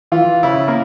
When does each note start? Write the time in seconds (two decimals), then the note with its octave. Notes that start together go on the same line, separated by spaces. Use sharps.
0.12 E3 F4
0.43 C#3 E4
0.68 A#3